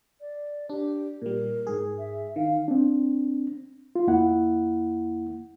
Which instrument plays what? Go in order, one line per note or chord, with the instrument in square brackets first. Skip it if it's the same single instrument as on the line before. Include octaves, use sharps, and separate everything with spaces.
[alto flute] D5
[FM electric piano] D4 [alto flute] G4
[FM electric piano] A#2 G3 [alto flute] A#4
[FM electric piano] G#2 G#4
[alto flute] E5
[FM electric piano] D#3 [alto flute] F5
[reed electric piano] C4 D4
F4
F2 A#3 E4 F#5